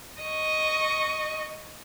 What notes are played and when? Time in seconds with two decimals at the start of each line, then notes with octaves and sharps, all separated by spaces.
0.22 D#5 C#6